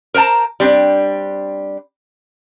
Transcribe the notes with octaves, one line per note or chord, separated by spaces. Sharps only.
A#4 C5 F#5 A5 A#5
G3 C4 D4